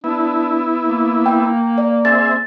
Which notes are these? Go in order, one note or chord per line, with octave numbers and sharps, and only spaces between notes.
B3 D4 E4
A#3
G5
D5
C4 G#4 E5 A6